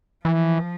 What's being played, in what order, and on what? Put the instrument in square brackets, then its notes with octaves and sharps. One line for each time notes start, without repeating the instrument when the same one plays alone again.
[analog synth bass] E3 [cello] F3